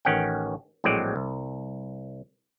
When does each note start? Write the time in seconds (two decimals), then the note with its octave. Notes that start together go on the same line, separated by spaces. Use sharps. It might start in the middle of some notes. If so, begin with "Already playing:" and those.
0.05 A1 D#3 C#4 F#5 G5
0.84 A#1 A2 F#3 G#3 C4 D5
1.16 C2